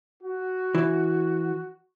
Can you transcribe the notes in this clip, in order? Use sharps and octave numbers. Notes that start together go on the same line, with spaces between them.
F#4
E3